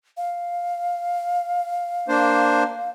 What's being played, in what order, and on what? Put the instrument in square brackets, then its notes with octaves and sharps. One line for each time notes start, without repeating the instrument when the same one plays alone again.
[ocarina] F5
[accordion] A#3 D4 C5